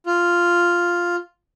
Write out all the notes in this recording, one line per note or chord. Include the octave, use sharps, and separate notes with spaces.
F4